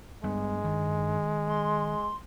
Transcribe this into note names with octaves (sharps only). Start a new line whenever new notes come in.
G2 G3 G#3 B3
D#3
C6